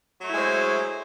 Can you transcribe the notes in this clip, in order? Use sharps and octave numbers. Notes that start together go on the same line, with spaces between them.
F#3 G#3 A3 E4 C5